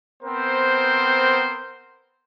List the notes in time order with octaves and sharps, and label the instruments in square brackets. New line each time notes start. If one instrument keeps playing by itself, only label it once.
[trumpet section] B3 C4 A#4 C5